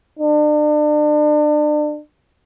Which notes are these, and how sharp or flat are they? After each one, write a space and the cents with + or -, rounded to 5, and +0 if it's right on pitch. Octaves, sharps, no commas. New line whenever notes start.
D4 +35